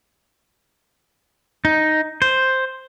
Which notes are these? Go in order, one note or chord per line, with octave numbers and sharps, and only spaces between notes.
D#4
C5